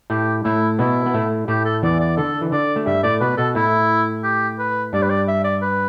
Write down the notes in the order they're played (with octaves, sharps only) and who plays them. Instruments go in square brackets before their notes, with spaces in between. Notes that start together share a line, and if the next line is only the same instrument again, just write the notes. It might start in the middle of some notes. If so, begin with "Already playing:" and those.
[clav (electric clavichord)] A2 A3 [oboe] G4
[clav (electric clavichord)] A2 A3 [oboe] E4
[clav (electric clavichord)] B2 B3 [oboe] E4
[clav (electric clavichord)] B3
A2 A3
[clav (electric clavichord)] A2 A3 [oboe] G4
[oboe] A4
[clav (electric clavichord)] E2 E3 [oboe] D5
[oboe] D5
[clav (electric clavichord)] D3 [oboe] A4
[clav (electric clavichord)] E3
[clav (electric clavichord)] D3 [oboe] D5
[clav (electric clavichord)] A3
[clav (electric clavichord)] G2 G3 [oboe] E5
[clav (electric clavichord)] A2 A3 [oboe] D5
[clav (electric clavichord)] B2 B3 [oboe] B4
[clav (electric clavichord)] B2 B3 [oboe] A4
[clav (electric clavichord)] A2 A3 [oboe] E4
[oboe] G4
B4
[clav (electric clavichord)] G2 G3 [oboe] D5
[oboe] B4
D5
E5
D5
B4